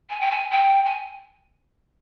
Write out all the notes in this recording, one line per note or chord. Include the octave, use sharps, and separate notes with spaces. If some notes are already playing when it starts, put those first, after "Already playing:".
G#5
G5
G#5
G5
G#5